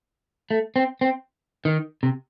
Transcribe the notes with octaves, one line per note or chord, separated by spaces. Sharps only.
A3
C4
C4
D#3
C3